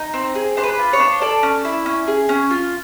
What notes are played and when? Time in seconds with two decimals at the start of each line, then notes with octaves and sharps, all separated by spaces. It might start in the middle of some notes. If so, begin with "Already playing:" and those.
Already playing: D#4
0.14 C4
0.35 G#4
0.57 D4 C5
0.63 B4
0.79 F4
0.93 C#5
1.00 D4
1.21 A4 D5
1.43 C#4
1.65 E4
1.86 C#4
2.08 G#4
2.29 C#4
2.50 F4